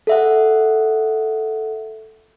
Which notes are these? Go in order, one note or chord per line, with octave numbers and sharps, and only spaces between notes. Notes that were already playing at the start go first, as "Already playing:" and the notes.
A4 E5 F#5